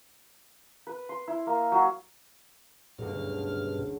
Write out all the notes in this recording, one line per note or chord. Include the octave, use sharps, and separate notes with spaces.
B4
C6
E4
A#3
F#3
F#1 D2 G2 B2 F6